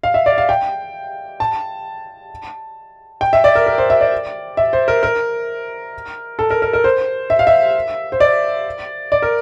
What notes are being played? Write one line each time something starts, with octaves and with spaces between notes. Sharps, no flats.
F5
E5
D5
F5
G5
A5
G5
E5
D5
A#4
A#4
C5
E5
D5
E5
C5
A#4
A#4
A4
A#4
A#4
A#4
C5
E5
F5
E5
C5
D5
D5
A#4